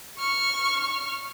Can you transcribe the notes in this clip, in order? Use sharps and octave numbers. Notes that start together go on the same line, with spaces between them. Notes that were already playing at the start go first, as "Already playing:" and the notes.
C#6 F6